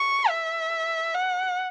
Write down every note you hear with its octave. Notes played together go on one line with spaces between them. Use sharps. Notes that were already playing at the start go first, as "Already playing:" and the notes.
Already playing: C#6
E5
F#5